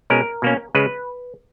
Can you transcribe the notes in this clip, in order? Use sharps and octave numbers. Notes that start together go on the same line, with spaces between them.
B2 G#3 C#4 A#4
B2 A#3 C#4
C#3 G#3 B4